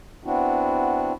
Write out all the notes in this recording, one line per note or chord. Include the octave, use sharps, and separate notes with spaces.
B3 C4 D4 E4 F#4